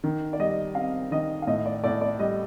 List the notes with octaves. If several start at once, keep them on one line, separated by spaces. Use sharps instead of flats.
D#3
D5
G3 D#5
C4 F5
D#3 D#5
F5
A2 D#5
D5
A2 D5
D5
G3 D#5